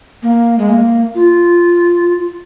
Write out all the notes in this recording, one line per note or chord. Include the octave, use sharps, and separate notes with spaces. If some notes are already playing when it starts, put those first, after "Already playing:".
A#3
G#3
A#3
F4